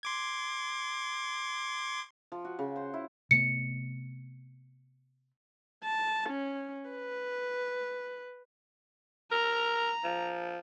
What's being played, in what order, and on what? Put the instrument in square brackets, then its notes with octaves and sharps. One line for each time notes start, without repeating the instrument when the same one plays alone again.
[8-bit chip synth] C6 D6 G#6
[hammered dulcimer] F3
F#4
C#3
C5
E4
[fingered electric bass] C3 A3 B3 [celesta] C#7
[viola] A5
C#4
B4
[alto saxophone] A#4 [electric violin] A#5
[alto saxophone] F3